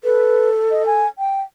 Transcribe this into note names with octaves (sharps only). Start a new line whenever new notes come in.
A4 B4
D#5
G#5
G5